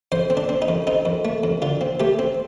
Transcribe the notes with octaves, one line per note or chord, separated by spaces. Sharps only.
F2 C5
C4
D4
C4
D#4
F2
C4 D#4
F2
A3
F2
D3 F4
C4
A3 G4
C4